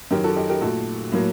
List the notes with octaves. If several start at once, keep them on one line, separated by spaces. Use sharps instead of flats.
F#2 D#3 F#3 G4 A#4
F#4 A4
D#4 G4
G4 A#4
A#2 A3 F#4 A4
A2 F#3 A#3